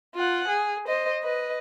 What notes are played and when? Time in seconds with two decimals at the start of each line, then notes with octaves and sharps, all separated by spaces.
0.15 F4 F#5
0.48 G#4
0.87 C5 D#5
1.23 B4 D#5